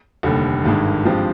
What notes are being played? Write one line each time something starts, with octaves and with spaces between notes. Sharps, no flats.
F1 D#2 D3 G3
G#1 G2 D#3 G#3
G2 F3 G#3 C4 G4